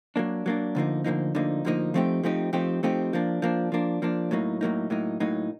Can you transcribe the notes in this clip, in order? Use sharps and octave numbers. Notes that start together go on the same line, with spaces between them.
F#3 A#3 D4
F#3 A#3 D4
D2 D3 F3 A#3 D#4
D2 D3 F3 A#3 D#4
D2 D3 F3 A#3 D#4
D2 D3 F3 A#3 D#4
F3 A3 C4 D#4 G4
F3 A3 C4 D#4 G4
F3 A3 C4 D#4 G4
F3 A3 C4 D#4 G4
F3 A#3 D4
F3 A#3 D4
F3 A#3 D4
F3 A#3 D4
A2 F#3 A#3 D#4
A2 F#3 A#3 D#4
A2 F#3 A#3 D#4
A2 F#3 A#3 D#4